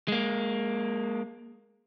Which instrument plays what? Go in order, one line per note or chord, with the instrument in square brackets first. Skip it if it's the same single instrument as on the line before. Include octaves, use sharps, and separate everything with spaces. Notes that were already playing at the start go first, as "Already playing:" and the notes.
[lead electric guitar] G#3 A#3